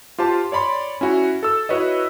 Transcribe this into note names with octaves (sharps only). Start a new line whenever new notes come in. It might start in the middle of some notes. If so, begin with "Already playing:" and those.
F4 G4 C5 A5
C#5 D5 B5 C6
C#4 E4 F#4
A4 E6
E4 F#4 B4 C#5 D#5